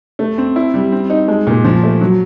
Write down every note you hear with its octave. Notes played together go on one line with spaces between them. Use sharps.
A3
C4
E4
G3
C4
D#4
G#3
A#2
F3
A3
F#3